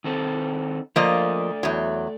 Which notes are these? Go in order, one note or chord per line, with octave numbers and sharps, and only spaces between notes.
D#3 C4 A4
F3 A3 A#3 D5 D#5
E2 F#3